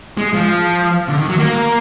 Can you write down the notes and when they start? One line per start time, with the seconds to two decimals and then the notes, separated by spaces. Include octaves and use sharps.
0.17 G#3
0.34 F3
1.09 D3
1.18 D#3
1.28 F#3
1.39 A#3